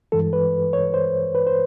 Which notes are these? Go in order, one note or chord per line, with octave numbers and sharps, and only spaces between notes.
G2 E3 G#3 A4
B4
C#5
C5
B4
C5